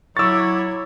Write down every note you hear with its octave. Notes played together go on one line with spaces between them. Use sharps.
F#3 E4 C#5 C#6 D6 E6 A6